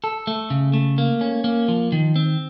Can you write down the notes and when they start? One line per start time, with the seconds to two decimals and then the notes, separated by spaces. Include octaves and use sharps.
0.04 A4
0.27 A3
0.50 C#3
0.74 A3
0.98 A#3
1.21 C#4
1.44 A#3
1.68 F3
1.92 D#3
2.16 C4